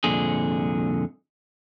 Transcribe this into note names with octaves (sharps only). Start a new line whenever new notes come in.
C2 F2 A#2 D3 G#4